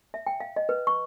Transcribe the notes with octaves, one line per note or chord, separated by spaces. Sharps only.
E5
G5
F5
D#5
B4
C#6